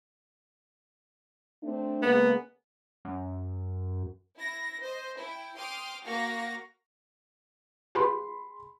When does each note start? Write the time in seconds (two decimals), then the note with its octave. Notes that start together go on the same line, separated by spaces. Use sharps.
1.63 A3 C4 D4
2.02 C#3 G#3 A#3 B3
3.05 F#2
4.38 E4 A#6
4.81 C5 D#5
5.18 E4 G5
5.56 G5 C6 D6 D#6 F6
6.04 A#3 F#4 F5 C#6 A#6
7.95 F4 G4 G#4 B4 B5 C6